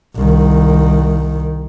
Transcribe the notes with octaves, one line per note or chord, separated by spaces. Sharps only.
C2 D#3